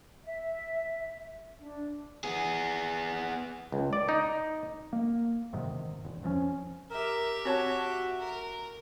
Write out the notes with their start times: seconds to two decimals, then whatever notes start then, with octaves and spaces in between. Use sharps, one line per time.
0.24 E5
1.62 D4
2.24 B3 G#4
3.72 C#2
3.93 D5
4.09 D#4
4.93 A#3
5.53 E1 G#2 C3 D#3
6.05 E1
6.23 F2 F3 G#3 C#4
6.91 G4 A#4 E5
7.45 C4 F#4 C#5 A5
8.20 A#4